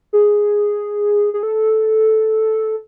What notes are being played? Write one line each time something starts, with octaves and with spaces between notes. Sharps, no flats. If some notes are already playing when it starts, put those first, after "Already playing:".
G#4
G#4
A4